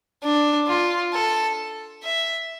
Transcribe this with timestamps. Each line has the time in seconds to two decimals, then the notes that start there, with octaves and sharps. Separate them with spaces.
0.24 D4
0.68 F4
1.14 A4
2.03 E5